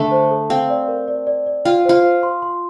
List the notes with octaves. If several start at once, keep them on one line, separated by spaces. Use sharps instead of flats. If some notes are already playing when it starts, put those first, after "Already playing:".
Already playing: D3 A3
C5
A4
C4 F5
D5
A#4
D5
D5
D5
F4 G5
F4 C5
C5
C6
C6